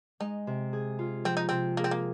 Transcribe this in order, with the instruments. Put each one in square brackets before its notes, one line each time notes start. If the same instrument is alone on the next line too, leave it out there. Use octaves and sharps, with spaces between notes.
[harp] G#3 [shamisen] D#4
[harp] C3
G#4
F4
[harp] F3 [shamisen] C4
[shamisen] D#4
[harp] C3 [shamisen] C4
[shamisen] A#3 [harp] G#4
[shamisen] C4
A#3